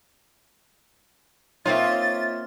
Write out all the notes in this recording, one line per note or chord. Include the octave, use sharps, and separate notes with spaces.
A#3 C4 D#4 F4 C#5 E5 A6